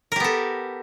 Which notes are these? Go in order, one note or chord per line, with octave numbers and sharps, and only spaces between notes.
B3 G4 A4 A#4